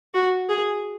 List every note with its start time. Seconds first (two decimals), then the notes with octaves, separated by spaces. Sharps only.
0.14 F#4
0.49 G#4